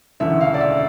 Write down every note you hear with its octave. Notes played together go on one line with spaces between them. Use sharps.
E1 D2 C#3 E3 E5
F5
D5
E5